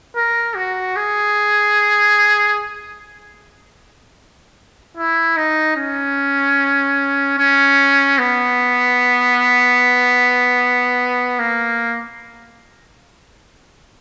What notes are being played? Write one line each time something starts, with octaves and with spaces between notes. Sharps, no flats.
A#4
F#4
G#4
E4
D#4
C#4
C#4
B3
A#3